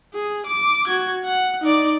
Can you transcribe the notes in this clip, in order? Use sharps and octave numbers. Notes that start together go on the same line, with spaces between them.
G#4
D6
F#4 G#6
F#5
D#4 D5